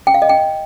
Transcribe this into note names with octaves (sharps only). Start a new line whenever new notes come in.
G5
F5
D#5
G5